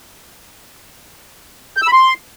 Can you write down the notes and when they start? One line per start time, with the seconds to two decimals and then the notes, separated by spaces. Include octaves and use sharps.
1.77 G6
1.82 E6
1.87 B5
1.93 C6